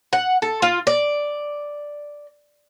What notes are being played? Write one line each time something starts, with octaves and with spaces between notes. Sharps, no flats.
F#5
A4
F4
D5